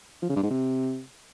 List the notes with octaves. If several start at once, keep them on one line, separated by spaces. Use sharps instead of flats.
F3
C#3
G2
G#2
C3